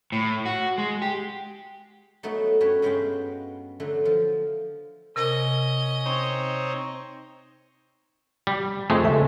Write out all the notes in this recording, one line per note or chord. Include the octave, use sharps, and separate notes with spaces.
A2
F#4
G#3
G4
F#3 A3 B3 D#4 F#4
G2 C#4 B4 C#5 G5 A5
G2 G#3 B3 F#4 F5 G5
D3 F#3 A3
F3
C3 C#4 A#4 D#5
C4 D#4 C#5
G3
F2 G#3 A3
C#2 A4 E5